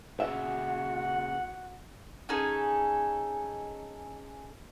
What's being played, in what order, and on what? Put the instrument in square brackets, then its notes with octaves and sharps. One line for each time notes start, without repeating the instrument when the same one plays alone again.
[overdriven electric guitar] A#2 C#3 [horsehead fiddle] F#4 [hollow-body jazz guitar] E5 [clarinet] F#5
[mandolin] C#4 D#4 G#4 A4